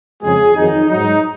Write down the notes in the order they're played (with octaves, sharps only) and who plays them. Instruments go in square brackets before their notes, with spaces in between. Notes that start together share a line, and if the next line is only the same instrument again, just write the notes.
[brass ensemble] F2 C#3 G#3 G#4
F2 D#3 F#3 D#4
G#2 F#3 D#4